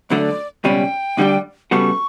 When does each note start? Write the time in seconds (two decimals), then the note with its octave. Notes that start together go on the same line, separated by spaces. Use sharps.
0.10 D2 D3 F#3 A3 D5
0.64 C#2 B2 G3 C#4 G5
1.17 D2 D3 G3 D4 G4
1.71 C#3 G3 B3 F#4 A4 C#6